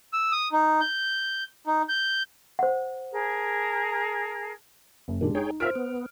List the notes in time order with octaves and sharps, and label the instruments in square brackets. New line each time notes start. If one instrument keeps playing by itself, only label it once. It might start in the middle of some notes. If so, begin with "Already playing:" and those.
[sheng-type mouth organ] E6
D#6
D#4
G6
D#4
G6
[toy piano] C5 F#5
[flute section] G#4 A#4 A5
[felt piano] F#1
[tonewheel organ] A#2 D#3 [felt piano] G#3 D4 G4
[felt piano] D#4 [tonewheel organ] G#4 C#5 G5
[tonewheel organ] F4 A#4 E5 [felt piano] C5 F6 D7
[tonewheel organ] B3